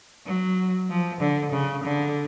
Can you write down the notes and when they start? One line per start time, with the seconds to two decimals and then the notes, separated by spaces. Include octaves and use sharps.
0.26 F#3
0.89 F3
1.21 D3
1.52 C#3
1.84 D3